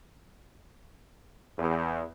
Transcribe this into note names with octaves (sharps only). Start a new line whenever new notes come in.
E2